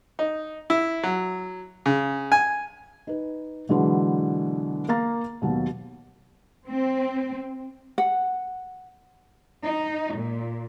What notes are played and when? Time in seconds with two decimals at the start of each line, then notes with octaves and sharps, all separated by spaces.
0.19 D#4
0.70 E4
1.03 F#3
1.86 C#3
2.32 G#5
3.07 D#4 B4
3.69 B2 D3 E3 F#3 G#3 B3
4.88 A#3 F5 A#5 A6
5.42 D#2 B2 F#3
6.68 C4
7.98 F#5
9.63 D#4
10.16 A#2